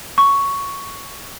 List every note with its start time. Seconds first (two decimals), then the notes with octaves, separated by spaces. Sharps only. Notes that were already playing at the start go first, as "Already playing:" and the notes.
0.18 C#6